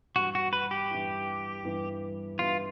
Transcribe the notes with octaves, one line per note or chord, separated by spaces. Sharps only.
G2 E3 G3 B3 E4 F#4
F#4
B4
G4
G2 E3 G3 B3 E4
G2 E3 G3 B3 E4
G2 E3 G3 B3 E4 F4